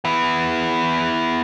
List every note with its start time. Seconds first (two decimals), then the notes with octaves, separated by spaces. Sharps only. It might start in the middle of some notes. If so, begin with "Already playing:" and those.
0.05 B3 E4